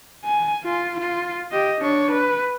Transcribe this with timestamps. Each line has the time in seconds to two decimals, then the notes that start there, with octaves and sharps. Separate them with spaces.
0.25 G#5
0.65 F4
1.00 F4
1.52 G4 D#5
1.81 D4 C#5
2.11 B4